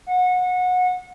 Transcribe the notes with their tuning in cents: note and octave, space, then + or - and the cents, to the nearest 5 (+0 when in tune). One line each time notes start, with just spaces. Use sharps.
F#5 -25